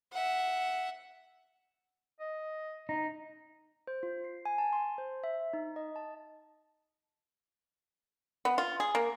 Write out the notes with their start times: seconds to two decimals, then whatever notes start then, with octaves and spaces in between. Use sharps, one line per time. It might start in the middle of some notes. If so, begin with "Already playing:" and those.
0.13 E5 F#5
2.19 D#5
2.89 D#4
3.87 C5
4.03 F4
4.24 C7
4.45 G#5
4.58 A5
4.73 C6
4.98 C5
5.24 E5
5.53 D#4
5.76 D#5
5.96 A5
8.45 B3
8.58 F4
8.80 G#4
8.95 A#3